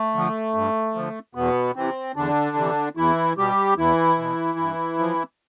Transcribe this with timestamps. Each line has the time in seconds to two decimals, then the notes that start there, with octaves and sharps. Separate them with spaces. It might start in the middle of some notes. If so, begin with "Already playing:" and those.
Already playing: A3
0.14 D3 F3
0.54 G2
0.95 D3 F3
1.35 E2 B2 B3
1.76 C3 E3 C4
2.16 E2 D3 D4
2.57 C3 E3
2.97 E2 E3 E4
3.37 B2 G3 G4
3.78 E2 E3 E4
4.18 B2
4.59 G2
4.99 F3